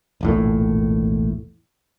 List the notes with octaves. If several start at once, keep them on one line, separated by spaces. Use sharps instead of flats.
E1 A#1 A2